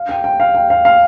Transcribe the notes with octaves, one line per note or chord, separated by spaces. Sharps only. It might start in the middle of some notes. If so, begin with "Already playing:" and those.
Already playing: F5
G5
G5
F5
G5
F5
F5